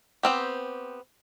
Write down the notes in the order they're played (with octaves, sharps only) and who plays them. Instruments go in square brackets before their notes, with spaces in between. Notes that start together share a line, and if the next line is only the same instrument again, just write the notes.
[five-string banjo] B3 C4 G4